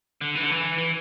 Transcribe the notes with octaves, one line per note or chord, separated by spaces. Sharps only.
D3
E3
D3
E3
E3